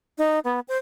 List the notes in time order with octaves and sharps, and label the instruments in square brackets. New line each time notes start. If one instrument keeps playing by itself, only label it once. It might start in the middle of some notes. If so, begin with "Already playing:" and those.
[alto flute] D#4
B3
C5